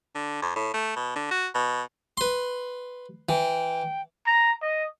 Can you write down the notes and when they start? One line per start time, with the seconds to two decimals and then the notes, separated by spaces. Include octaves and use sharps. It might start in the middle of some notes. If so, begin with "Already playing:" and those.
0.15 D3
0.42 F2
0.56 A2
0.74 A3
0.96 B2
1.16 D3
1.31 F#4
1.54 B2
2.17 B4 C6
3.29 E3 G5
4.27 A#5
4.62 D#5